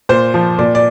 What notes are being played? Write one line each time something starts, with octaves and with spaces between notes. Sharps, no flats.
A#2 C5
F3
A#2 D5
D5